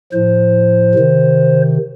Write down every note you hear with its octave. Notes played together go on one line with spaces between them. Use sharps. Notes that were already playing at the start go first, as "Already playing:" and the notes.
A2 F3 C5
C3 D#3